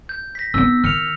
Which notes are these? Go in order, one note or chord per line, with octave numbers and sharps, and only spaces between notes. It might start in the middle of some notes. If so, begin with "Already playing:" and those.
G6
A#6 B6
B3 D#4 E6
D#3 F6 C#7 F7